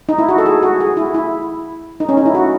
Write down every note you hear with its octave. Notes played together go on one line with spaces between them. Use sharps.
D#4
E4
F#4
A4
G#4
F#4
G#4
E4
E4
D#4
C#4
D#4
E4
F#4